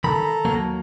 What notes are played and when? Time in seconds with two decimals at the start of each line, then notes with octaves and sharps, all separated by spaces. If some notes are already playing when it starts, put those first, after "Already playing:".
0.04 D#3 A4 A#5 B5
0.45 D#2 F#3 A#3